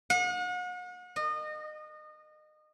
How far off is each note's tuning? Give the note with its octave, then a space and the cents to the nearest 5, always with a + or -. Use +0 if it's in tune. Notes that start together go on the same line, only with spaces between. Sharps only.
F#5 -40
D#5 -30